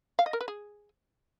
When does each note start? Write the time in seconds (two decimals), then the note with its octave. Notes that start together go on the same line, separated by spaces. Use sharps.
0.19 F5
0.26 D#5
0.33 A#4
0.41 B4
0.48 G#4